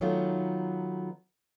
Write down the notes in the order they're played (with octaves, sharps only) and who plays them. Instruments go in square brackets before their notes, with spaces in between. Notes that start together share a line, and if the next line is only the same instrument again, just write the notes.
[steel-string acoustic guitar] D#3 F#3 A3 B3 D#4 F4